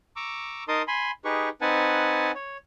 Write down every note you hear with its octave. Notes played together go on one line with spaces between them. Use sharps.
A#5 C#6 D6 E6
D#4 A#4 A5 C6 D#6
G#5 B5 C6
D#4 G4 G#4 B4 C#6
C4 D#4 B4 F#5 G#5 A5
C#5